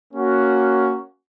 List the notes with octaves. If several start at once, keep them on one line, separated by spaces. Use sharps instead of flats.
A#3 C#4 F#4